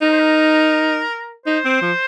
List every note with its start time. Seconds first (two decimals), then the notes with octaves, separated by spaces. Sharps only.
0.01 D#4 A#4
0.11 C5
0.19 A#4
1.46 D#4 C5
1.65 C4
1.81 F3